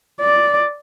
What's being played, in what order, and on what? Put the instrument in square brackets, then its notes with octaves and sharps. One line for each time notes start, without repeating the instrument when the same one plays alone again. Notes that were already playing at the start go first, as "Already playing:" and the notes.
[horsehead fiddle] D5